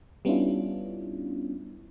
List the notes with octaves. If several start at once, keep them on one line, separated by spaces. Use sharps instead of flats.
G3 B3 C#4 D4 E4 F4